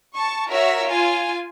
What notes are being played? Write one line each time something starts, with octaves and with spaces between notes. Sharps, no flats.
A5 C#6
F#4 A#4 C#5 E5
F4 G#5